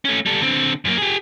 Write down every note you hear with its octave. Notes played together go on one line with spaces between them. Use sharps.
A3 C#4
G3 A4
D3 C4
F#2 A#3
G4 G#4